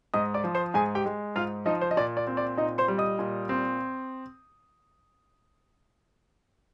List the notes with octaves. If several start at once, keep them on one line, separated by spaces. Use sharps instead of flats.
G#2 D#5 D#6
D5 D6
F3
C5 C6
G#2 G#4 G#5
G4 G5
G#3
G#2 F4 F5
F3 D#4 D#5
C5
D#5
A#2 D5
D5
C4
D5
A#2 D#4 D#5
C5 C6
G3
D#5 D#6
A#2
C4